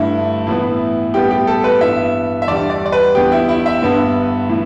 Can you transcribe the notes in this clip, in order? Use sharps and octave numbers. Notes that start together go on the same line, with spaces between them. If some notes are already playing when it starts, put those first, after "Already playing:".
Already playing: G2 D3 A3 E4
A2 E3 B3
A2 G3 B3 G4
G4
A4
B4
G2 E3 B3 E5
E5
E2 D3 G3 D5
D5
D5
B4
E2 D3 B3 G4
E4
E4
E5
G2 D3 B3
A2 E3